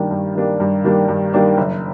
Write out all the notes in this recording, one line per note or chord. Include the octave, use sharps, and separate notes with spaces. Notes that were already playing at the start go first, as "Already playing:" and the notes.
Already playing: G2 D#3 G3 A#3 D4
G2
D#3 G3 A#3 D4
G2
D#3 G3 A#3 D4
G2
D#3 G3 A#3 D4
F#1